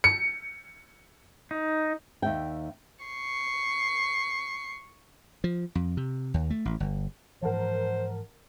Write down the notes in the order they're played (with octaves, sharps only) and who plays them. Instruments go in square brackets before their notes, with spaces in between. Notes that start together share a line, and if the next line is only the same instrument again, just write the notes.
[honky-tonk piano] C#7
[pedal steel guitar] D#4
[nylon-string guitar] D#2 E5 G5
[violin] C#6 C7
[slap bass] F3
F2
C3
D#2
A3
A1
G1
[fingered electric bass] G#2 E3 F3 [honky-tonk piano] A#4 F#5 A5 [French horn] C5